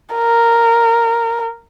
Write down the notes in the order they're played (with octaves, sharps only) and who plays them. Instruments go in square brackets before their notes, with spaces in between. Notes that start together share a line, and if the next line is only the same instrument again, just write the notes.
[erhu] A#4